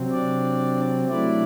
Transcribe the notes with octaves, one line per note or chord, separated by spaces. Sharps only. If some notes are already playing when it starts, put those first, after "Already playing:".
Already playing: C3 F#3 C4
D4 D5
C3 F#3 A3 D4 E4 D5